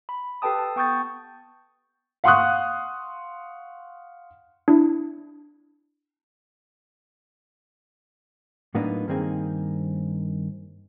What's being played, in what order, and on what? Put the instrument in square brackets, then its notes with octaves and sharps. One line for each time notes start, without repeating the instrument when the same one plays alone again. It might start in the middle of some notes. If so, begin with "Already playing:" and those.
[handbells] B5
G4 A4 B4 G5 A5 D#6
A5
B3 G5 C#6 D#6 G6 A6
[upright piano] F5 F#5 C6 C#6 D#6 F#6
[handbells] D4 E4
[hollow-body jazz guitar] A2 F#3 A#3 B3 D4 D#4
G2 D#3 A#3 C4 D#4 G#4